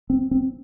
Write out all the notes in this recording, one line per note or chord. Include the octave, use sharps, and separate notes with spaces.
C4
C4